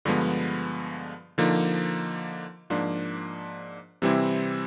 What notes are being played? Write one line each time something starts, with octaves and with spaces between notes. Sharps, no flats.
G2 D3 F3 G#3 B3
D3 F3 A#3 D#4
G#2 F3 A#3 D4
C3 E3 G3 C4 E4